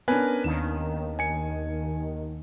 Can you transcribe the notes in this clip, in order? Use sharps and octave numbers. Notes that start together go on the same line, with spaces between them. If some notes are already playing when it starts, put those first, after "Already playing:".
B3 C#4 D4 A#4 B4 G#5
D#2 D#3 E7
G#5 C#7